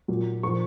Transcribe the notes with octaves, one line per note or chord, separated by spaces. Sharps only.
A#2 F#3
A#2 F3 C#6